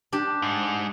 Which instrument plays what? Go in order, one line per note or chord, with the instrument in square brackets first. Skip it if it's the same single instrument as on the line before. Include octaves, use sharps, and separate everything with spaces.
[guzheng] D4 G4
[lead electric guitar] G#2